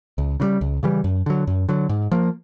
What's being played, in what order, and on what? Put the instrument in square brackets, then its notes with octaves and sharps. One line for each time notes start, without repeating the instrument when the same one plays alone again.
[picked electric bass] C#2
C#3 E3 G3
C#2
C#3 E3 G3
F#2
D3 F#3
F#2
D3 F#3
G#2
F3 A#3